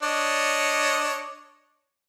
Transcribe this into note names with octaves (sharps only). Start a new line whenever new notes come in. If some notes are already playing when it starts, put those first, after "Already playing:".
D4 C#5 D#5